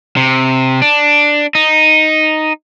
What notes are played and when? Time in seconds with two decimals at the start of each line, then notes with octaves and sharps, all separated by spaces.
0.17 C3
0.82 D4
1.55 D#4